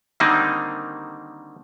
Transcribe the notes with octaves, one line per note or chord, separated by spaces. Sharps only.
D3 D#3 G3 A#3 C4 D#4